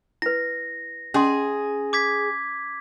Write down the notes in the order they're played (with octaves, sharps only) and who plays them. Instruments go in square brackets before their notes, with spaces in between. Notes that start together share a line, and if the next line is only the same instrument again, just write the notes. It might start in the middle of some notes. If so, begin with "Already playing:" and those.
[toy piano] E4 B4 [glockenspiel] A#6
[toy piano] C#4 D#5 C6 [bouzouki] G#4
[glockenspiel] D6 G#6 B6